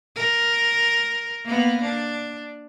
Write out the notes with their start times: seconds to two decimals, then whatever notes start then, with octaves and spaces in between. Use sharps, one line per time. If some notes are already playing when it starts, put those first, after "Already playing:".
0.16 A#4
1.46 A#3 B3
1.82 D4